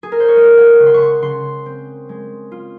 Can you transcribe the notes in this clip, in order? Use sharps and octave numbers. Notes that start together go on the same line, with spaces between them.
G#4
A#4
C5
C#5
G#3 D#5
F#5
C#3 C#6
C6
C#6
C6
C#3 C6
C4
G#3
F4